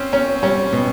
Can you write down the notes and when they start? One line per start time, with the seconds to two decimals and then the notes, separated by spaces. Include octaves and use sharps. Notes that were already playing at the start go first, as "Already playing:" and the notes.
Already playing: C4 C#4
0.13 B3 C#4
0.43 G3 C#4
0.73 B2